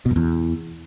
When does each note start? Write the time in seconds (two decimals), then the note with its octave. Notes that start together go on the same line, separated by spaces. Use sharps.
0.06 B2
0.11 F#2
0.16 E2